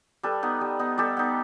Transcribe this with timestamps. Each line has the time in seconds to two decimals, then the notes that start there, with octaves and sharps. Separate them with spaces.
0.23 G3 A4 B4
0.43 B3 D#4
0.61 G3
0.79 B3 D#4
0.98 G3 G4 A4
1.17 B3 D#4